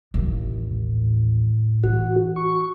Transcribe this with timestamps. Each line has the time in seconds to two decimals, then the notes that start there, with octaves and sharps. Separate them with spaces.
0.14 A1 D#2
0.70 A2
1.84 E3 F#4
2.36 C#6